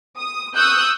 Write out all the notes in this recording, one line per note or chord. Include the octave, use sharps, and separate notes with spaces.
D#6
C#6 D#6 E6 F#6 G6